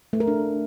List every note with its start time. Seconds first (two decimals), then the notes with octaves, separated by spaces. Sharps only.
0.13 A3
0.20 A#4
0.28 D4